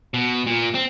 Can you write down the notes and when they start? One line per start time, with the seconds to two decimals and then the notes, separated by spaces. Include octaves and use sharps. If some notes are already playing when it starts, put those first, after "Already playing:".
0.14 B2
0.47 A#2
0.74 C4